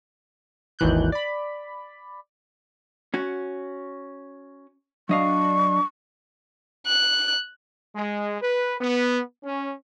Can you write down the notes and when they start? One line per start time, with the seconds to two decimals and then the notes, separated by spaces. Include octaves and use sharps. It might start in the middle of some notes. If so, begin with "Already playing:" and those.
0.79 G#1 D#2 E3 F#6 G6
1.12 D5 B5
3.14 C#4 F#4
5.09 F#3 D4 D#5 F5 C#6
6.87 F#6
7.96 G#3
8.41 B4
8.81 B3
9.44 C#4